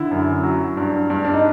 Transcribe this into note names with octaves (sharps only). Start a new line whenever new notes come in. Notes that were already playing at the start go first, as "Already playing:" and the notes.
Already playing: D3 E4
F#2
F#3
G2
G2
D4
D#4